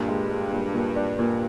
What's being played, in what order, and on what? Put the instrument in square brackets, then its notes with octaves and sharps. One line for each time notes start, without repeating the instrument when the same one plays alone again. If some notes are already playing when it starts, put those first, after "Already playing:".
Already playing: [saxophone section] G2 [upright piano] A#2
[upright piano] G#3
G#3
A#2
A#2
D4
A#2